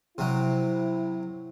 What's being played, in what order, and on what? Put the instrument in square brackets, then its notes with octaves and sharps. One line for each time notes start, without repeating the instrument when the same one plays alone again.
[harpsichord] C3 F#3 [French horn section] E4